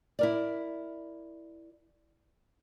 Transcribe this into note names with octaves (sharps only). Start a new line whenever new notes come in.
E4 A#4 D5